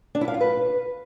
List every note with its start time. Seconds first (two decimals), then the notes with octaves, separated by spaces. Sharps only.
0.15 D4
0.21 E4
0.28 F5
0.34 F4
0.41 B4